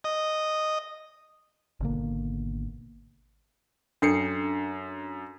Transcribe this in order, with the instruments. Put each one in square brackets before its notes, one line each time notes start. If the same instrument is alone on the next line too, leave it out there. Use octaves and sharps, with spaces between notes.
[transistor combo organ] D#5
[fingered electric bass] G#1 B2 D3 A#3
[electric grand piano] F#2 C7 C#7 [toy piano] D4 A4